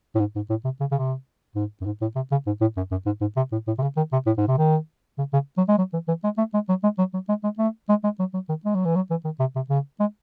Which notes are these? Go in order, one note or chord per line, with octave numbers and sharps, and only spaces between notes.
A2
G#2
G#2
A2
C3
C#3
C#3
C3
G#2
F#2
G#2
A2
C3
C#3
G#2
A2
F#2
F#2
G#2
G#2
C3
A2
A2
C3
C#3
D#3
C3
A2
G#2
C3
D#3
C#3
C#3
F#3
G#3
F#3
E3
E3
G#3
A3
G#3
F#3
G#3
F#3
F#3
G#3
G#3
A3
G#3
G#3
F#3
F#3
D#3
G#3
F#3
E3
F#3
E3
D#3
C3
C3
C#3
G#3